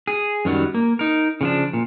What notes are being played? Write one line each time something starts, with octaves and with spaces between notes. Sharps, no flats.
G#4
F#2 D#3 F#3 G3
A#3
D#4 A#4
C#3 F3 D4
A#2